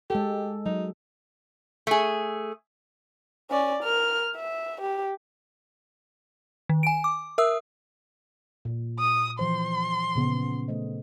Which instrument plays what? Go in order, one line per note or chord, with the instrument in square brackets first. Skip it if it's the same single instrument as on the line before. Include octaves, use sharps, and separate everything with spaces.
[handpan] G#3 A4 [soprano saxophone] G4
[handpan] F#3 [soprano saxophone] D#4
[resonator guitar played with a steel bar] A3 G#4
[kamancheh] C#4 D5
A#4 F6
E5
G4
[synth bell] D#3
G#5 D7
D6
A#4 E5 D#6 E6
[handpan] A#2
[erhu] D#6
[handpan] E3 F3 C5 [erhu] C6
[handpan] A#2 C#3 B3
A3 C5 D#5